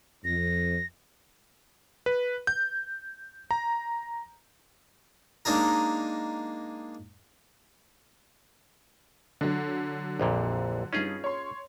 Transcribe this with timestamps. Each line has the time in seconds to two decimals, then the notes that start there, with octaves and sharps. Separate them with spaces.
0.25 F2 A#6
2.06 B4
2.47 G6
3.51 A#5
5.45 G#3 A#3 D4 D#4 G#4 A#4
9.41 D3 F#3
10.20 A#1 F2 A#2
10.93 G2 C#4 D#4 F4 G#4
11.24 C#5 C6